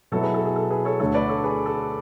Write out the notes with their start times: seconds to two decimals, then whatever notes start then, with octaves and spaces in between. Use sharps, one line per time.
0.12 B2 F#3 B3 E4 A4 C#5
0.23 G#4 B4
0.34 A4
0.45 G#4
0.56 A4
0.70 G#4 B4
0.85 A4 C#5
1.00 D2 D3 A3 A4 C#5
1.14 B4 D5
1.29 A4 C#5
1.44 G#4 B4
1.66 A4